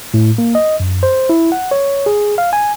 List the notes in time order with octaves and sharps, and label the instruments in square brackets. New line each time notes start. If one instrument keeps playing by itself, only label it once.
[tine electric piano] A2
A#3
D#5
F#2
C5
E4
F#5
C#5
G#4
F5
G#5